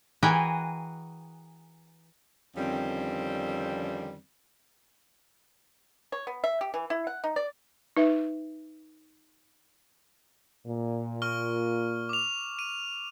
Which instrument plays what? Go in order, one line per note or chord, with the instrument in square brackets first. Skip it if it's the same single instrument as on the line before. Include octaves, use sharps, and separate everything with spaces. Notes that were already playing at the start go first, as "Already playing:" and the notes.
[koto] E3 F#4 G#4 A#4 B4 G5
[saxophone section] F2 D3 D#3 G3 C4 C#4
[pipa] C#5
B3
E5
G4
E3
E4
F#5
D#4
D5
[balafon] D#4 B4 E5
[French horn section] A#2
[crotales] C#6 F6 G7
D6 F7
D#7